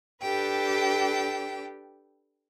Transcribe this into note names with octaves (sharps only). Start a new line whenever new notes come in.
D4 G4 A4 B4 G5